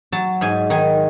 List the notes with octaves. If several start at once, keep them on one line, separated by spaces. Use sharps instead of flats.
F#3 A5
G#2 G#5
D#3 G#5